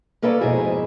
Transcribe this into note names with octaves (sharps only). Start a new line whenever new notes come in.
A#3 C#4 A4 B4 C#5 D5
F2 G#2 B2 E4 G#4